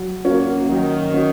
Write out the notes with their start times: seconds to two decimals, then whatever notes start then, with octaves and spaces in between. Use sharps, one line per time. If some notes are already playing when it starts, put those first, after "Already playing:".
Already playing: F#3
0.25 A#3 C#4 F#4
0.69 D#3 F#3
1.14 C#4 F#4